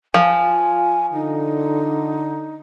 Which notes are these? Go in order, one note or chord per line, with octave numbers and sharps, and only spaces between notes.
F3 G#5
F4
D3 D#4